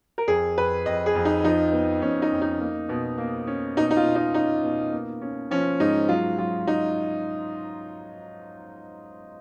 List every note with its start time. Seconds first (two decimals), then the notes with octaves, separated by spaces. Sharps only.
0.18 A#4
0.27 F2 G#4
0.57 F2 B4
0.86 F2 D#5
1.06 G#4
1.15 F2
1.25 D#4
1.44 F3 D#4
1.73 B3
2.02 F2 C#4
2.22 D#4
2.32 F2
2.42 D#4
2.61 A#3
2.89 B2
3.18 A#3
3.47 C#4
3.77 B2 D#4
3.91 D#4
3.96 F4
4.06 B2
4.15 D#4
4.34 C#4 D#4
4.63 B2
4.92 A#3
5.21 C#4
5.51 F3 C#4
5.80 G#2 D#4
6.08 F#3 F4
6.38 F#3 F4
6.67 F#3 D#4